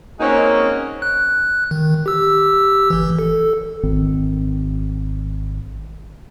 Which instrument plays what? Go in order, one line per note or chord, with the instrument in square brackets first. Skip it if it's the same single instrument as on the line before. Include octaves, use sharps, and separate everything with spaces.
[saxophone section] G#3 A#3 C4 C#4 D#4 F#4
[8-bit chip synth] F#6
D#3
G4 E6
G1 E3
A4
[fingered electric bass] G#1 D#3 C4